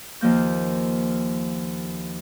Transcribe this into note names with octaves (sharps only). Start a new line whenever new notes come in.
D#2 F3 A#3 G6